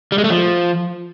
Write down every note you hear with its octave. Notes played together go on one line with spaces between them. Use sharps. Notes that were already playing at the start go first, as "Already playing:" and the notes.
G3
G#3
A3
F3